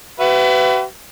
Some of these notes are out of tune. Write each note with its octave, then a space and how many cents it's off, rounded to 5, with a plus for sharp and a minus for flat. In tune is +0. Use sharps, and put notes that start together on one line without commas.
F#4 +45 B4 +25 E5 +35